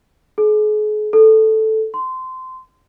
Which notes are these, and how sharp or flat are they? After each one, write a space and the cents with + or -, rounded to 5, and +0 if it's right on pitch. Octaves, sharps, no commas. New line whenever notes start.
G#4 +40
A4 -5
C6 -20